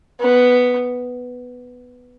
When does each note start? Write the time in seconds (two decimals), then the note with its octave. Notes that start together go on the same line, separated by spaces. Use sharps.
0.21 B3